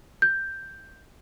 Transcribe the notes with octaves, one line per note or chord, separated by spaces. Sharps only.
G6